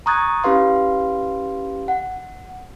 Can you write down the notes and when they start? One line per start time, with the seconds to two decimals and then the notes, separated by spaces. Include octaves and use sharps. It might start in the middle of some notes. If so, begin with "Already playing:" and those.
0.06 A#5 C#6 D#6 F#6 G#6 A6
0.44 C#4 E4 G4 B4 F5 C6
1.88 F#5